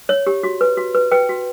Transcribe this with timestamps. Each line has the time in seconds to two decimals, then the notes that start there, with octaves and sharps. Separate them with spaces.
0.09 C#5
0.27 G4
0.43 F#4
0.61 B4
0.77 F#4
0.95 B4
1.12 B4 G5
1.29 F#4